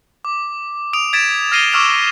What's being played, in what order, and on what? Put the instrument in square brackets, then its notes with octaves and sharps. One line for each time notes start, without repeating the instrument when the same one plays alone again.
[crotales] D6
D#6 D7 F7
G#6 A6 B6 D7 E7
F6 A#6 C7 D#7 F7 G7
C#6 D6 E6 F6 E7 F7